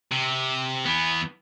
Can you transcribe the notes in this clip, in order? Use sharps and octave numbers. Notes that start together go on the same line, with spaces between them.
C3
E3 B3